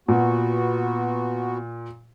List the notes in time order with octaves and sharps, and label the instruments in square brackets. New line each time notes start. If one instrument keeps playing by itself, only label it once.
[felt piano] A#2 [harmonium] B3 F#4